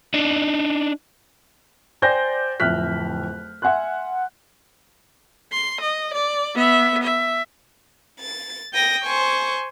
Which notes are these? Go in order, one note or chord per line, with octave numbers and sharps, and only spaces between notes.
D4 D#4
C5 D5 G5 G#5 G6 A#6
D1 F2 E5 F6 F#6 B6
E5 F#5 G#5 C6 F#6
C6
D#5
D5
B3 E5
E5
A6
G5 D#6 A#6
C5 G#5 C#6